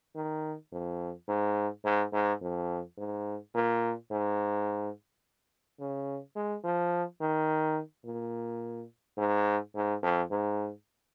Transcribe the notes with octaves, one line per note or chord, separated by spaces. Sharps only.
D#3
F2
G#2
G#2
G#2
F2
G#2
A#2
G#2
C#3
G#3
F3
D#3
A#2
G#2
G#2
F2
G#2